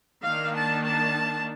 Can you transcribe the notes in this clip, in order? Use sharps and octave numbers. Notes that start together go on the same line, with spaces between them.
D#3 A#3 D4 F5
A5
A5